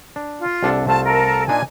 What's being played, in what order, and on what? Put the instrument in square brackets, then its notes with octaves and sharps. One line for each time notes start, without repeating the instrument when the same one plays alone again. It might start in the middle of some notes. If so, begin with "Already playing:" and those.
[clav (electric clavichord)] D4
[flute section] F4
[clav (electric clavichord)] C2 D4 A4
[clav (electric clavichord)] C2 A3 F4 [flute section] A5
[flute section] A4 A#4
[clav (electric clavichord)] A#2 D4 D#4 [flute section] G#5